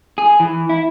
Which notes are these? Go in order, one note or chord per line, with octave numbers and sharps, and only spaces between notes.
G#4
E3
E4